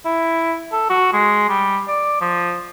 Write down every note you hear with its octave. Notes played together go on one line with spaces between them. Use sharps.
E4
A4
F#4
G#3
G3
D5
F3